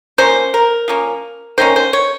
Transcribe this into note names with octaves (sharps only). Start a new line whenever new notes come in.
F3 A#3 C#4 C5
A#4
F3 A#3 C#4
D#3 A#3 C#4 C5
C5
C#5